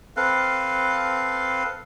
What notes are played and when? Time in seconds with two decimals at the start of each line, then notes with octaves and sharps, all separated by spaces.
0.17 C4 A4 B4 F5